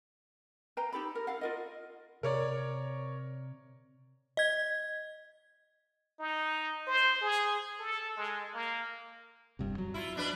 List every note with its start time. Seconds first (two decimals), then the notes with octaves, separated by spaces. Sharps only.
0.77 B4 F5 G5 A#5
0.93 D#4 G4 A4 B5
1.15 A#4
1.27 A4 F5 F#5
1.41 F4 A#4 D#5
2.23 C3 A#4 C#5 D5
4.37 D#5 G#6
6.19 D#4
6.87 C5
7.21 G#4
7.80 A4
8.17 G#3
8.54 A#3
9.59 F1 G2 C3
9.78 F#3
9.94 E4 F4
10.15 B2 D4 B4